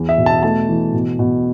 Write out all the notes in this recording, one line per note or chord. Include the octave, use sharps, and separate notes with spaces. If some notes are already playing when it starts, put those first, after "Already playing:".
Already playing: E2
E5
B2
A5
A3 A5
E3
B2
B2